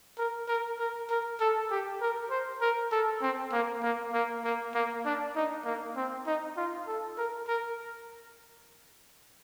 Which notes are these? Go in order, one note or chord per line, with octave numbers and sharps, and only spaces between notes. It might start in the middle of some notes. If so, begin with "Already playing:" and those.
A#4
A#4
A#4
A#4
A4
G4
A#4
C5
A#4
A4
C4
A#3
A#3
A#3
A#3
A#3
D4
D#4
A#3
C4
D#4
F4
A4
A#4
A#4